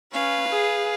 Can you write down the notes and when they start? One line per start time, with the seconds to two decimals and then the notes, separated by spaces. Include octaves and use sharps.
0.12 C#4 B4 F5
0.48 G#4